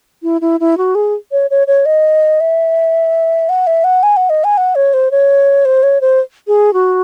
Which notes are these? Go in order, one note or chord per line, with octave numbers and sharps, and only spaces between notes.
E4
E4
E4
F#4
G#4
C#5
C#5
C#5
D#5
E5
F#5
E5
F#5
G#5
F#5
D#5
G#5
F#5
C#5
C5
C#5
C5
C#5
C5
G#4
F#4